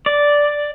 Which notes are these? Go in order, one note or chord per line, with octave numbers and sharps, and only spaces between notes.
D5